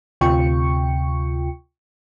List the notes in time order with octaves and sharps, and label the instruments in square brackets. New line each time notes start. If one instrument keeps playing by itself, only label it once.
[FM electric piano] D2 C3 F4 G5 C#6 C#7